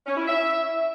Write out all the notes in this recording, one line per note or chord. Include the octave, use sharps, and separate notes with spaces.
C#4
E4
E5